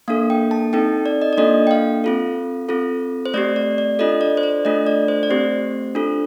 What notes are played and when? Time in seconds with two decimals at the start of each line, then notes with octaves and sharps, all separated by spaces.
0.08 A#3 D4 A4 F5
0.30 G5
0.51 A5
0.73 C4 D#4 A4 G5
1.06 D5
1.22 D#5
1.33 D5
1.38 A#3 D4 F4 A4 D#5
1.67 G5
1.71 F5
2.04 C4 F4 A4
2.69 C4 F4 A4
3.26 C5
3.34 A3 C4 G4 D5
3.56 D5
3.78 D5
3.99 D4 F4 A4 D#5
4.21 D5
4.37 C5
4.43 D5
4.65 A3 D4 F4 A4 D#5
4.86 D5
5.08 C5
5.23 D5
5.30 A3 C4 G4 C5
5.95 D4 F4 A4